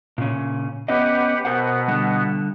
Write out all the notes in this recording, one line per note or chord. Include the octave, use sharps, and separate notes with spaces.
A#2 C#3 C#4
B3 C#4 G4 B4 D#5 F#5
B2 B3 A#4 C5 F#5
D3 G3